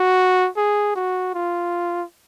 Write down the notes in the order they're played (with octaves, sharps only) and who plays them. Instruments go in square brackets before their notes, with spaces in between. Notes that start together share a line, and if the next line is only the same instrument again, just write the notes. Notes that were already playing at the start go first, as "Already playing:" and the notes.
Already playing: [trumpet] F#4
G#4
F#4
F4